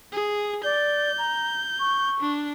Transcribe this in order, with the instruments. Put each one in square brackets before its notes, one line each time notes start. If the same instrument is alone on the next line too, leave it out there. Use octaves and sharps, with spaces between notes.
[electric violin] G#4
[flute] D5 [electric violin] G6
[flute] A#5
C#6
[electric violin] D4